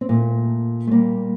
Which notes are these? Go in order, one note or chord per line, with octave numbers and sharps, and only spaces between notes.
C4
A#2 A3 A#3
A3
A#2 G3 A#3